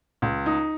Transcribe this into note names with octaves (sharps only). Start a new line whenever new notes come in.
C#2
D#4